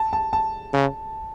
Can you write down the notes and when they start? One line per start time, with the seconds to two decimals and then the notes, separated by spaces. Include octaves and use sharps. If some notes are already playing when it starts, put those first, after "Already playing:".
Already playing: A5
0.13 A5
0.33 A5
0.73 C#3